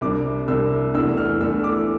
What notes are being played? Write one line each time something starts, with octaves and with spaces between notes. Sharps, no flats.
C2 C3 G3 D4 D6
C2 C3 G3 D4 E6
E2 E3 A3 D4 E6
F6
E2 E3 A3 D4 E6
D6